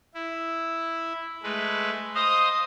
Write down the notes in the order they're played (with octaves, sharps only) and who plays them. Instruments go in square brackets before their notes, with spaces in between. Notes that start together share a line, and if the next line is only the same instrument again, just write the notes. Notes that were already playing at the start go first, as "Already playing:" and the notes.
[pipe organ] E4
G#3 A3 B4
[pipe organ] C5 D#5 F5 [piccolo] D#6